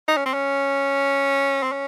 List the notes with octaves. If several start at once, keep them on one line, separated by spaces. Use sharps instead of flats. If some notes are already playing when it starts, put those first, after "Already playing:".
D#4
C#4
C4
C#4
C4
C#4